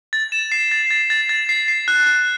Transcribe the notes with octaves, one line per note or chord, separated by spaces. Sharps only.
A6
E7
C7
A6
A6
A6
A6
C7
C7
F#6
F#6